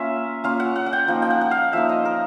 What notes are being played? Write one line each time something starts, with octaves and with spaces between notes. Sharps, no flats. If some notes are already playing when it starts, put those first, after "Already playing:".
Already playing: A#3 C#4 F4 E5
A#3 C#4 F4 F5
F#5
F#5
F#5
G5
F3 A#3 D#4 G5
G5
F#5
F#5
F5
F3 A#3 D#4 E5
D#5
A#4